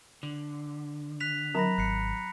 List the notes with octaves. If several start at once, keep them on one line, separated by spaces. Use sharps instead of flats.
D3
F#6 B6 F7
F#3 C4 A#4 A#5 B5 A#6
G#1 F#6 C7 C#7